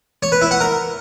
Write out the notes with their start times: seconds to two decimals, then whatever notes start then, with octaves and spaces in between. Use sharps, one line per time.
0.23 C#5
0.32 B4
0.42 E4
0.51 F#5
0.60 A#4